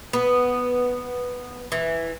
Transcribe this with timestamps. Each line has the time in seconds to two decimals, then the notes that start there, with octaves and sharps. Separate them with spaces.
0.13 B3
1.72 E3